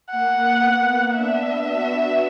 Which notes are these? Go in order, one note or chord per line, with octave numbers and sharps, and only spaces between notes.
A#3 F#5
B3
B3 D4 E5
D4 F#4